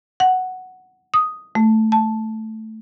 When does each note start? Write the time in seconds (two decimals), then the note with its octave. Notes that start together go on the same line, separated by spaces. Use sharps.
0.20 F#5
1.14 D#6
1.55 A3
1.92 A5